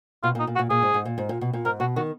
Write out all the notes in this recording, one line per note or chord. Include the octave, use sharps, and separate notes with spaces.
B2 F4
A#2
D#4
A#2
F#4
A#2
A#2 G#4
G#2
G#2
A#2
G#2
A#2
B2
A#2
G#2 A#4
B2 F#4
D#3 F#4